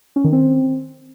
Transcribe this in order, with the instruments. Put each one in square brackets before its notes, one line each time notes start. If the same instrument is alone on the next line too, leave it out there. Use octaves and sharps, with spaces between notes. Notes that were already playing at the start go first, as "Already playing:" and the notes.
[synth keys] C#4
D#3
C4